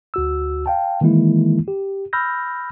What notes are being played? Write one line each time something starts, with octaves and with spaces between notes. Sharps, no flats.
D2 F#4 E6
F5 G5 A5
D#3 E3 G#3 A#3 E4
G4
B5 E6 F6 G6 A#6